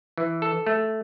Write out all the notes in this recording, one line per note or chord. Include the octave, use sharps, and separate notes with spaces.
E3
A4
A3